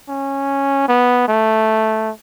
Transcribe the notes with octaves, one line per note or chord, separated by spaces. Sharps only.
C#4
B3
A3